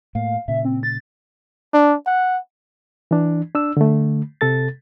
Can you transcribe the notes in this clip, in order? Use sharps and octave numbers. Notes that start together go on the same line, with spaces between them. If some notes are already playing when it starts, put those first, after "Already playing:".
A2 A#3 F5
A#2 C#3 E5
C4
A6
D4
F#5
E3 D4
D4 E6
D3 A3
C3 A4 A6